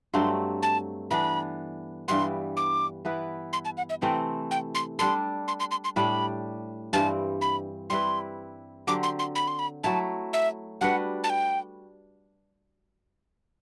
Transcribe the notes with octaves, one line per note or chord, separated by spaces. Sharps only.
G2 F#3 A3 C4 C6
A5
E3 B3 D4 B5
G2 E3 G3 B3 C6
D6
E3 B3 E4 B4
C6
A5
F#5
E5
C3 E3 A3 C4 G5
G5
C6
G3 D4 A4 C6
C6
C6
C6
C6
A2 G3 D4 B5
G2 E3 G3 C4 A5
B5
G3 C4 E4 B4 C6
D3 F#3 C4 G4 D6
C6
C6
B5
C6
B5
F#3 A3 E4 A5
E5
G3 D4 F#4 B4 F#5
A5
G5